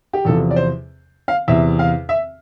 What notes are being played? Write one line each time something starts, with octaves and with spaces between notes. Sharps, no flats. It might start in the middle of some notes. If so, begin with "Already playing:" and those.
G4
E2 C3 F3 A4
D5
C5
F5
E2 C3 E3 E5
F5
E5